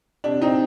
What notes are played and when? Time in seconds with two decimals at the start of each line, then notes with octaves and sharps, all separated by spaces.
0.24 C3 D4
0.42 C4 D#4